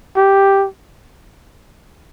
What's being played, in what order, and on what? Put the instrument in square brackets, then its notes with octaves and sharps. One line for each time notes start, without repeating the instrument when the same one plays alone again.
[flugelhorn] G4